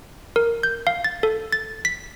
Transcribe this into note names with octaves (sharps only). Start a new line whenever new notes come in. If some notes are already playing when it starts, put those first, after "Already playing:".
A#4
G6
F5
A6
A4
A6
B6